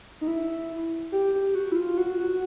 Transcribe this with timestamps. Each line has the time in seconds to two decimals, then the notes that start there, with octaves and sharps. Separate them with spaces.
0.21 D#4
0.27 E4
1.12 G4
1.34 G4
1.55 F#4
1.72 E4
1.76 F4
1.97 F#4
2.18 F#4